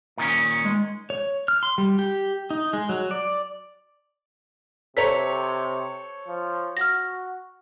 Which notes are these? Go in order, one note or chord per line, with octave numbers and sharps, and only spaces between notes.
A#2 D#3 C#4
G#3
C#5
F6
C6
G3
G4
D#4
G#3
F#3
D5
C3 A4 C5 C#5 A#5 B6
F3
F#4 F6 A#6